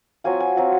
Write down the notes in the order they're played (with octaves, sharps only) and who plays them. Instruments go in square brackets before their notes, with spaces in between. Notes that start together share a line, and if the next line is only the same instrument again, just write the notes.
[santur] F#3 C4 F4 G#5
G#5
F#3 C4 F4